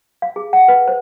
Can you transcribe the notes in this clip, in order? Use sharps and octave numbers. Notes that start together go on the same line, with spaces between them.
F5
G#4
F#5
B4
C5